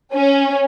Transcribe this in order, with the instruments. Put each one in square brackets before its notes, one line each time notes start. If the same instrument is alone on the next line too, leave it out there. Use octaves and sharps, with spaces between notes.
[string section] C#4